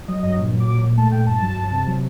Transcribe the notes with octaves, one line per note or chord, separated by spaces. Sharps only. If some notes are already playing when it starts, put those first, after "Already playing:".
F#3 D#5
G2 D#5
A#2
F#3
D6
A#2
A#2
A3 A5
A#2 G5
G2 A5
F#3
G2
C3
F#3